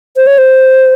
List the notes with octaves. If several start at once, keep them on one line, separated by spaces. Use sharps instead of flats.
C5
C#5
C5